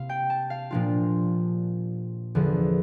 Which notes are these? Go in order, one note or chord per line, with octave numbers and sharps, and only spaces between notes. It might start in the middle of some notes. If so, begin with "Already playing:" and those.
Already playing: C3 A#3 E4 F5
G5
A5
F5
A#2 F3 A#3 D4 F4
E2 D3 F3